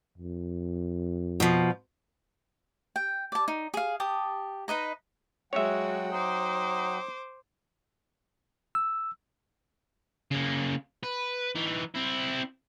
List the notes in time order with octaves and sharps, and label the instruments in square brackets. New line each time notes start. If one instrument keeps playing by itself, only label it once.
[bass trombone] F2
[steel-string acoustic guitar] B2 F3
[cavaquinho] G5
D5 A5
D#4
G#4 F5
G4 A5 D#6
D#4 B4 D#5 A#5
[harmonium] F#3 F#5 G5 [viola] G#3 F#4 [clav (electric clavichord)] C#5 E5
[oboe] D#4 [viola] C5 D6
[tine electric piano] E6
[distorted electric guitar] C#3 A#3
B4
E3 D#4
C4 E4